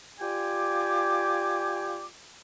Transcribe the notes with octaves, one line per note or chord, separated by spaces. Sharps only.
F4 G4 D5 G5 G#5 D6